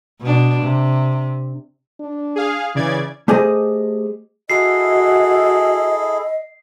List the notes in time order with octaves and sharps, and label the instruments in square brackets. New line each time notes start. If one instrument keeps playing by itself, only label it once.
[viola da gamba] B2 D4
C3
[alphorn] D4
[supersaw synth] G#4 F5
[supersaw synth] C#3 D5 G#6 [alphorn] E3
[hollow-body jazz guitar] A3 G4 G#4 C5 D#5
[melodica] E4 G#4 A4 [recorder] F#4 [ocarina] D#5 [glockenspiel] C7